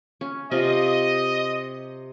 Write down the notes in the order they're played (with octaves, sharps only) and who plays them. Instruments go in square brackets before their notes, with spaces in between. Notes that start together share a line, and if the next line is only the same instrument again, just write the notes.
[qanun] C#4
[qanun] C3 F4 [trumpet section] D#5